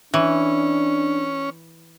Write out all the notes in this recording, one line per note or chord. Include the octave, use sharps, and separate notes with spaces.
E3 C#4 D4